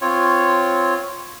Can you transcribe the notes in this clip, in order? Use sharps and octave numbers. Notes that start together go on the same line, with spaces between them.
C4 F4 C#5